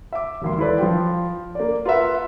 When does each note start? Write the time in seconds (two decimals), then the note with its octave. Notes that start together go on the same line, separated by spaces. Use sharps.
0.13 E5 D6
0.42 E1 D#2 C6
0.58 E4 A4 B4 D5
0.78 F3 F4 G5
1.55 A#3 D5
1.85 F4 A#4 B4 E5 F#5